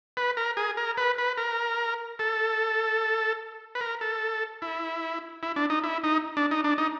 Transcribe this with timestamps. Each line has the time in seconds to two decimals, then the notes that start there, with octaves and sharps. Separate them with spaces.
0.17 B4
0.37 A#4
0.57 G#4
0.77 A#4
0.97 B4
1.18 B4
1.37 A#4
2.19 A4
3.75 B4
3.81 A#4
4.01 A4
4.62 E4
5.43 E4
5.56 D4
5.70 D#4
5.84 E4
6.04 D#4
6.37 D4
6.51 D#4
6.64 D4
6.78 D#4